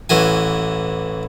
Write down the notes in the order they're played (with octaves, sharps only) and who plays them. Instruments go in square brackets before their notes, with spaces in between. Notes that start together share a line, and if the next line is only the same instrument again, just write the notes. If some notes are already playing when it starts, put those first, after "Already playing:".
[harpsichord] A1 E3 F#4 G#5